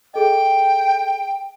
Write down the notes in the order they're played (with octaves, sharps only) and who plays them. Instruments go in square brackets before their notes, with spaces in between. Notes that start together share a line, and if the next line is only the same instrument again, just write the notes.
[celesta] G#4 A4 D#5 [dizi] G5